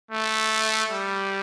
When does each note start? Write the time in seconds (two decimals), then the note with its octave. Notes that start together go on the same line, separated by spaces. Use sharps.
0.11 A3
0.91 G3